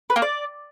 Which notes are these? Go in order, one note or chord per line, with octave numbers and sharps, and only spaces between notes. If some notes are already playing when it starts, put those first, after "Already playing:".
B4
A#3
D5